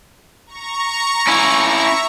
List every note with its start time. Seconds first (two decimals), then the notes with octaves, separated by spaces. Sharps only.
0.47 A#5 C#6
1.27 C#4 E4
1.62 E5 A#5 C#6